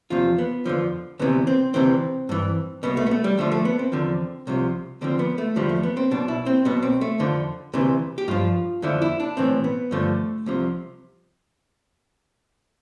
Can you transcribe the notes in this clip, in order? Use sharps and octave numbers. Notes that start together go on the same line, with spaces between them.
E2 C3 F3 F4
B3
F2 D3 F3
D2 C3 E3 B3
C4
D2 C3 E3 C4
G2 E3
C2 B2 B3
A3
B3
A3
G3
D2 D3 F3 A3
A3
B3
C4
E2 D3 F3
C2 C3 F3
D2 D3 F3 C4
B3
A3
E2 D3 F3 G3
A3
B3
C4
B1 B2 D4
E4
C4
B1 B2 B3
C4
A3
F2 D3 F3
D2 C3 E3
G4
G2 F3 F4
F2 D3 F3 E4
E4
D4
B1 A2 E3 C4
B3
G2 D3 F3 A3
C2 C3 F3